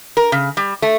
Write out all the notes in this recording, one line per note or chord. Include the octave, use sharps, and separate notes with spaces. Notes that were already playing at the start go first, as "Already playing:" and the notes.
A#4
C#3
G3
A3